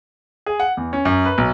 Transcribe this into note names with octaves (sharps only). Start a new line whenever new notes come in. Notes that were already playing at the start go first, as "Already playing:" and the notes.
G#4
F#5
E2
C#4
F#2
B4
B1